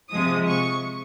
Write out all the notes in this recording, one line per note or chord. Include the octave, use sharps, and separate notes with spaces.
C3 F3 G#3 D#6
C#6